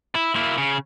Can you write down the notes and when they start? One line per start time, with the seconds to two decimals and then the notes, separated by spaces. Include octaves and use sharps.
0.15 E4
0.36 A#3 E4
0.58 C#3